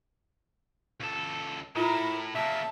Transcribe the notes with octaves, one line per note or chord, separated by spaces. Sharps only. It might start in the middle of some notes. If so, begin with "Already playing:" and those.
C#2 A4
A2 E4 F4 A#4 A#5
C#3 A#3 E5 A5